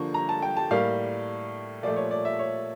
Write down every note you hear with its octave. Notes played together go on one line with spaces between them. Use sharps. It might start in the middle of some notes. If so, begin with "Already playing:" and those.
Already playing: D3 F3 A#3 C#6
A#5
A5
G5
A5
A2 G3 A#3 F5
A#2 F3 A3 D5
C#5
D5
E5
C#5